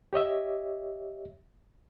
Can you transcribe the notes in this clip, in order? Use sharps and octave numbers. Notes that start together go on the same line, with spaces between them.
G4 C#5 D#5 E5